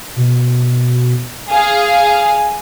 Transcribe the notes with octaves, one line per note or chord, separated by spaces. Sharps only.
B2
G#4 F5 G#5